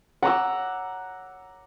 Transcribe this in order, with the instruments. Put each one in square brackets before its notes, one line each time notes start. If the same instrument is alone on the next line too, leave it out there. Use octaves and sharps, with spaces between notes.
[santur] F#5 A#5 D6 E6